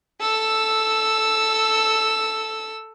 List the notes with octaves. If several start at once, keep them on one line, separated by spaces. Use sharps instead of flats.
A4 E6